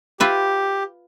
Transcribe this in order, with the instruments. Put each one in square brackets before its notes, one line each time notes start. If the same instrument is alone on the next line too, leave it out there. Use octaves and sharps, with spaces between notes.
[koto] F4 B4 E5 [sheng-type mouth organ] G4